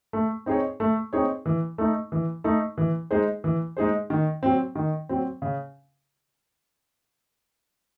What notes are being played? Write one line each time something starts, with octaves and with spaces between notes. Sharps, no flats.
A3
C4 D#4 G#4 C#5
A3
C4 D#4 G#4 C#5
E3
A3 D#4
E3
A3 D#4
E3
G#3 D#4 G#4 C5
E3
G#3 D#4 G#4 C5
D#3
F#3 C4
D#3
F#3 C4
C#3